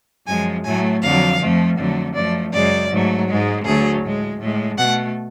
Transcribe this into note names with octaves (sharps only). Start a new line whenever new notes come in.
F#2 F3 G#3 G#5
A2 F#3 A3 G#5
F2 D3 F#3 F5
F2 F3 A3
F2 D3 F#3 A3
F#2 F3 A3 D5
F#2 C#3 G#3 D5
G#2 F#3 A3
G#2 G#3
D2 D3 F#3 A3 G#4
A2 G#3
A2 G#3
B2 A3 F#5